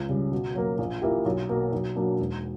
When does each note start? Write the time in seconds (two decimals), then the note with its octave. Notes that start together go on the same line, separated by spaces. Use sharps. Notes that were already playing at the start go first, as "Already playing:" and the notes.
Already playing: C#2
0.09 C#3 G3
0.32 B2
0.55 F#3 A#3
0.78 A#1
1.02 A#2 A#3 E4 G4
1.26 B1
1.49 B2 A#3
1.72 B1
1.96 B2 F#3 A#3 D4
2.19 E1